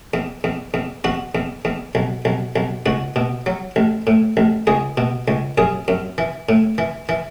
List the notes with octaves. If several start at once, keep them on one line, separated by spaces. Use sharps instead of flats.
E2
E2
E2
E2 F#4
E2
E2
B1
B1
B1
C#2 F#4
B2
F#3
A1
A2
A1
C#2 G#4
B2
C#2
F#2 G#4
F#2
E3
A2
E3
E3